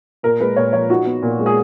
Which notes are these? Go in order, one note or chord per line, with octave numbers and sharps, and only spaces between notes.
A#2 A#4
G#3 B4
A#2 C#5
F3 C#5
D#4 F#4
B3
A#2
G#3
G#4